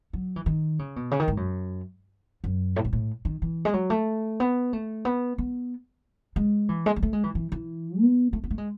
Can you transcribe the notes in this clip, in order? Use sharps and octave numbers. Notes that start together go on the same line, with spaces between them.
F#3
E3
D#3
C#3
B2
C#3
D#3
G#2
F#2
F#2
A2
G#2
A2
D#3
E3
G#3
F#3
A3
B3
A3
B3
B3
G#3
E3
G#3
G#3
A3
G#3
E3
E3
E3
B3
A3
B3
A3
G#3